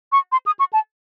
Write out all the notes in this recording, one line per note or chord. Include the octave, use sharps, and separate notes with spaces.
C#6
C6
D#6
C#6
A5